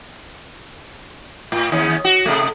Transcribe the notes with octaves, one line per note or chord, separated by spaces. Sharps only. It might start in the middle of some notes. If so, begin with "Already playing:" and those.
A2
D#2 C#4
F#4
C3 A3